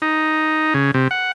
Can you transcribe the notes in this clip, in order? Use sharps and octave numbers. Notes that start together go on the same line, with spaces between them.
D#4
C#3
C3
F#5